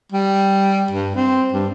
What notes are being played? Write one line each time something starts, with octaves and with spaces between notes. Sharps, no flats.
G3
G2
C4
G2